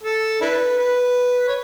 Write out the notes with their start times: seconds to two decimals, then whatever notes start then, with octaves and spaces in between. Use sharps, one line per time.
0.03 A4
0.41 D4 E4 B4
0.79 B4
1.48 C#5